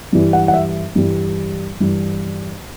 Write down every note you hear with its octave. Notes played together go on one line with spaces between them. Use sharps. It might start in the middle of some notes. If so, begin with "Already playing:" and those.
G2 E3 G3
F#5
F#5
E5
G2 E3 G3
G2 E3 G3